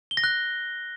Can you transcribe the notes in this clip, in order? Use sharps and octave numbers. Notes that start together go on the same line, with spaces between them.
G7
A#6
F#6